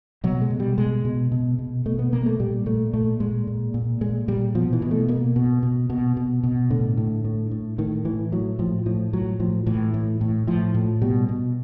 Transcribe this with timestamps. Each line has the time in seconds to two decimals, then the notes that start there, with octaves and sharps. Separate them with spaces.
0.24 B2 F#3
0.42 G#3
0.51 B2
0.60 G3
0.78 B2 G#3
1.05 B2
1.32 B2
1.59 B2
1.86 B2 A3
1.99 B3
2.12 B2 A#3
2.26 A3
2.40 A#2 G3
2.66 A#2 A3
2.93 A#2 A3
3.20 A#2 G#3
3.47 A#2
3.74 A#2
4.01 A#2 G#3
4.28 A#2 G3
4.55 B2 F3
4.73 E3
4.82 B2
4.91 A3
5.08 B2 A#3
5.36 B2
5.63 B2
5.90 B2
6.17 B2
6.43 B2
6.70 A2 D3
6.97 A2
7.25 A2
7.51 A2
7.78 A2 D#3
8.05 A2 E3
8.32 A2 F#3
8.59 A2 F3
8.86 A2 F3
9.13 A2 F#3
9.40 A2 F3
9.67 A2 E3
9.94 A2
10.21 A2
10.47 A2 F3
10.74 A2
11.02 B2 G3
11.29 B2